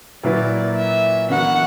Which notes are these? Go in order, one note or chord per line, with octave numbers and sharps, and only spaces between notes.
A#2 F#3 A#3 E4 B4 D5
E5
E3 B3 D4 F#4 A#4 F#5